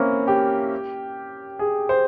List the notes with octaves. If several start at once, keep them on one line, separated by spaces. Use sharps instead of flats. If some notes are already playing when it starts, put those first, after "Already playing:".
Already playing: A#3 C4 C#4 E4
G4
G#4
C5